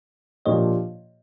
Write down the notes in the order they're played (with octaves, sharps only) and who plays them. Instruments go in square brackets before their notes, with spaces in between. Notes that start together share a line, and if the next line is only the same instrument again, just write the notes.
[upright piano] A#2 F3 A#3 D4 G4 [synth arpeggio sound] C#5 D#5